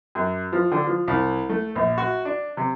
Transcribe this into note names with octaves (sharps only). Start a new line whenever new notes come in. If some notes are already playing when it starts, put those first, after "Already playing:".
F#2
F3
D3
F3
C2
A3
A#1
F#4
D4
C3